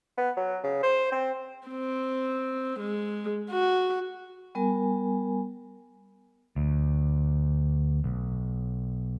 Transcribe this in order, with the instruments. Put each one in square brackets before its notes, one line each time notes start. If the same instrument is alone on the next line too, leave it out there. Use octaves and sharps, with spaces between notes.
[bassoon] B3
F#3
C#3
C5
C4
[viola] C4
G#3
F#4
[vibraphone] G3 B3 A#4 G#5
[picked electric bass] D2
B1